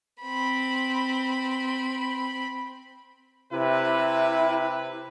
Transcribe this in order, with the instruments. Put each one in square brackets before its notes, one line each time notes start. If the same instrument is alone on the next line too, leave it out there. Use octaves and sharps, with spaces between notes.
[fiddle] C4 B5
[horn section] C3 B4 [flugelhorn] E4